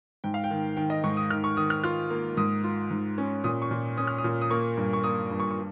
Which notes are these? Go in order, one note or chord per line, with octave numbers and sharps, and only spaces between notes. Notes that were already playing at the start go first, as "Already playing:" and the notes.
G#2 G5
F5
G5
D#3
D#3 G5
D#5
G#2 C#6
D#6
D#3 F6
C#6
D#3 D#6
F6
F4 F6
A#3
G#2 D#6
F4
G#2
C#4
A#2 D#6
C#6
A#2
C#4 D#6
F6
D#6
A#2
D#6
A#3 C#6
G2
C#6
A#3 D#6
G2
C#6
C#6